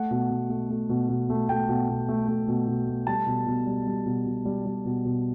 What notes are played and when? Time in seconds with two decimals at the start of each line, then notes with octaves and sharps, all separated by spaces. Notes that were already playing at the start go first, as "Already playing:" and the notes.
Already playing: A3 F#5
0.11 B2
0.30 B2
0.49 A3
0.70 A3
0.89 B2
1.09 B2
1.30 A3
1.49 A3 G5
1.69 B2
1.89 B2
2.09 A3
2.28 A3
2.48 B2
2.67 B2
2.87 A3
3.07 G3 A5
3.26 B2
3.46 B2
3.67 G3
3.87 G3
4.06 B2
4.26 B2
4.45 G3
4.66 G3
4.85 B2
5.05 B2